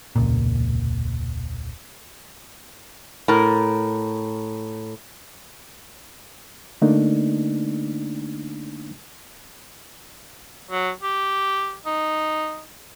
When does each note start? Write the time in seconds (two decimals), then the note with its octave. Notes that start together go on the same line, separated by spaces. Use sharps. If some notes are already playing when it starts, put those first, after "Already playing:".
0.16 E1 C#2 A#2
3.28 A2 A#4
6.82 D3 A3 A#3 D4 D#4
10.71 F#3
11.02 G4
11.86 D#4